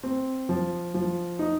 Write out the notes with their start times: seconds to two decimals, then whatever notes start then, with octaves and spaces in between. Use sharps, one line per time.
0.03 C4
0.49 F3
0.94 F3
1.39 D#4